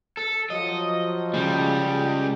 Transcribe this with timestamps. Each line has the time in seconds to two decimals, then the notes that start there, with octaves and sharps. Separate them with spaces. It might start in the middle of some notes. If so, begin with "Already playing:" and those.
0.17 A4
0.50 F3 F#3 D#5
1.34 C#3 G3 G#3